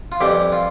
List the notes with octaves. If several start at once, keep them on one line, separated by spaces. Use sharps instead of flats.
F4
F2 E3 G3 G4
F4